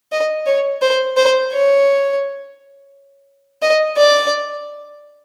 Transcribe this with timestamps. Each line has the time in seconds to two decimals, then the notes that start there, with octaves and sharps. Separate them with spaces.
0.12 D#5
0.46 C#5
0.82 C5
1.17 C5
1.52 C#5
3.62 D#5
3.97 D5